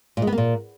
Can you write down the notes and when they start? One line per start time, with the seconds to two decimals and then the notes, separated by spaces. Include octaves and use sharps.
0.17 A#2
0.22 G#3
0.27 B3
0.32 A#3
0.38 A#2